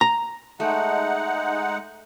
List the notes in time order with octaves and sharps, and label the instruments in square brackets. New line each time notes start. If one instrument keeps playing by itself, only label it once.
[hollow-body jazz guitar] A#5
[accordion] G#3 D#4 F#5 [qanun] A3